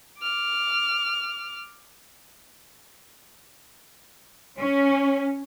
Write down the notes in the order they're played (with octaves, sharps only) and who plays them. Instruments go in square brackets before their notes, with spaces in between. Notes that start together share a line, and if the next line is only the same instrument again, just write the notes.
[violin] D6 F6
[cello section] C#4